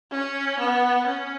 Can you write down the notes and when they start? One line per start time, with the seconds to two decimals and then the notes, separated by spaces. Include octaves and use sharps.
0.11 C#4
0.59 B3
1.06 C#4